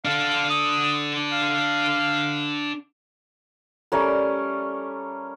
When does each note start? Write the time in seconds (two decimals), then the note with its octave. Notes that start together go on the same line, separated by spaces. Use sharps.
0.05 D4 A4 F5
0.50 D#6
1.32 F5
3.92 G3 A3 C#4 A#4